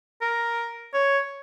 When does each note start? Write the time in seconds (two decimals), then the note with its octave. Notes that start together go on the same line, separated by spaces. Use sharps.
0.21 A#4
0.94 C#5